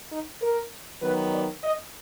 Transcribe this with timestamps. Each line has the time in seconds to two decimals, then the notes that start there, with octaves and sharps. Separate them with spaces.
0.10 D#4
0.41 A#4
1.02 D#3 F#3 B3 B4
1.32 D5
1.64 D#5